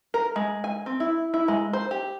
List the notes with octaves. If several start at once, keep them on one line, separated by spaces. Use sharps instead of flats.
A#4
G#3
G#5
C4
E4
E4
G#3
C5
G4